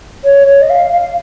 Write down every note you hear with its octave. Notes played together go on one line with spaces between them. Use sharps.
C#5
C#5
D#5
F5
F5